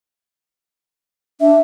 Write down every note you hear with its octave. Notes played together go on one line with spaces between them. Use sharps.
D4 E5